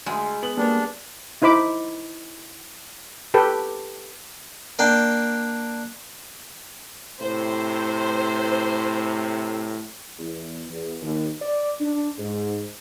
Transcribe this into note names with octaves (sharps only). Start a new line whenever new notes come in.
D2 G#3
B3 F#7
G3 A#3 B3 D4
D#4 E4 C5 B5 D6
G4 A4 B4 G5
A#3 D4 G5
A2 C3 C5
E2
E2
D#2
D5
D4
G#2